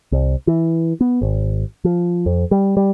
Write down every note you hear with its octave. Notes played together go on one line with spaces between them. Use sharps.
C2
E3
B3
G#1
F3
F2
G3
G3